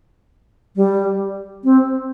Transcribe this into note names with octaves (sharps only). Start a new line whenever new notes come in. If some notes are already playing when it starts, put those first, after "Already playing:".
G3
C4